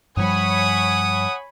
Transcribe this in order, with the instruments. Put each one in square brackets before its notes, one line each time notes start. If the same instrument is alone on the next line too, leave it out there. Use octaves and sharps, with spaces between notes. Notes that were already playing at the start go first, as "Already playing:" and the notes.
[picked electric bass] G2 F3 G3 [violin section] C#5 G#5 B5 [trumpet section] F#5 D#6